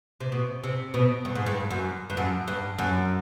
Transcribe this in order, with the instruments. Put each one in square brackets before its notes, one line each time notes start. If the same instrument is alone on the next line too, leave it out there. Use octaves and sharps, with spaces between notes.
[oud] C3
B2
C3
B2
G2
G#2
G2
F#2
G2
F#2
G2
F#2